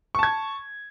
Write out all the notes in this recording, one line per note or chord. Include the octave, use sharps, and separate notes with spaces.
A5 C#6 G#6